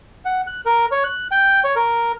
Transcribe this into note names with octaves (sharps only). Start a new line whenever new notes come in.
F#5
F#6
A#4
C#5
F#6
G5
C#5
A#4